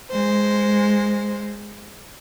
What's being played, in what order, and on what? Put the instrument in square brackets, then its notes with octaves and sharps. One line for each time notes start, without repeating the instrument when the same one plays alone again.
[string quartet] G#3 C5